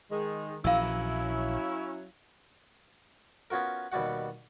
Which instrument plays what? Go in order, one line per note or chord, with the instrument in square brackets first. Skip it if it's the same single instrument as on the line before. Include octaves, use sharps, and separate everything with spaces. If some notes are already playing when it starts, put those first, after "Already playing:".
[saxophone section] D#3 G#3
[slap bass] A#1 E3 [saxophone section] F#3 C#4 E4 [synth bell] F5 E6
[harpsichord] B3 C#4 F4 F#4 A#4
D#2 B2 G3 F#4 F#5